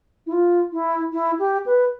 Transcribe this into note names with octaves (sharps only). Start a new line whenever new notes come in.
E4
F4
E4
E4
G4
B4